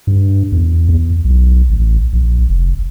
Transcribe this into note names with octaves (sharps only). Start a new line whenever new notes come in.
G2
E2
E2
B1
A1
A#1
F1